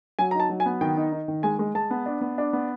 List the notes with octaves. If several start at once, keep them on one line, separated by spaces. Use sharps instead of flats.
F#3 G#5
A#5
D#4
A5
F#3
G#5
B3
D#3 G5
D#4
D#4
D#3
G#3 G#5
G#3
G#3 A5
B3
D4
B3
D4
B3